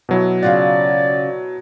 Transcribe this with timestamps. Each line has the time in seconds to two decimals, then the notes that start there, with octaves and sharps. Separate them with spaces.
0.09 B2 F#3 E4
0.42 C#3 F4 D5 F#5